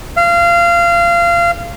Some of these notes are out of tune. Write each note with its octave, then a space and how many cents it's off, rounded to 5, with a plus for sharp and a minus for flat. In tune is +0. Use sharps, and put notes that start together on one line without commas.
F5 -25